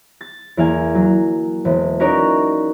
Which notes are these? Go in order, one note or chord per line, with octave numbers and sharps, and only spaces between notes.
A6
E2 A#3 F5 G#5
F#3
E1
C#4 D#4 F#4 A#4 C#5 D5